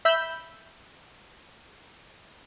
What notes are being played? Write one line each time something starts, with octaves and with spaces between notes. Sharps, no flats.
E5 B5 E6 G6